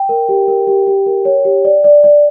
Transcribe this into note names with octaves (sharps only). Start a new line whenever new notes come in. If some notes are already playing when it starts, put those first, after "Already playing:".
Already playing: G5
A#4
G4
A#4
G4
G4
A#4
C#5
G4
D5
D5
D5